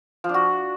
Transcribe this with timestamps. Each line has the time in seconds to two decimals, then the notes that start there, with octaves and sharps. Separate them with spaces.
0.24 F3
0.29 D4
0.34 F#4